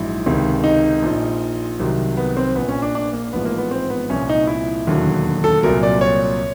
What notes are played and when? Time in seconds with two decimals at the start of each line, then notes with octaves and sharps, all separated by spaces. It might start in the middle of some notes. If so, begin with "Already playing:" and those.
Already playing: A#1 G#2 F#3 E4
0.26 C#2 C3 D#3
0.64 D#4
1.02 A#1 A#2 F3
1.79 C2 C3 D#3 F#3
2.17 B3
2.37 C4
2.55 A#1 A#2 F3 B3
2.69 C#4
2.82 D4
2.95 D4
3.13 A#3
3.33 A1 G#2 F3 B3
3.45 A#3
3.58 B3
3.71 C4
3.90 B3
4.10 C2 A#2 F3 C#4
4.29 D#4
4.47 E4
4.87 E1 D#2 D3 F#3
5.44 A4
5.63 C2 A#2 F#3 A#4
5.83 D5
6.01 C#5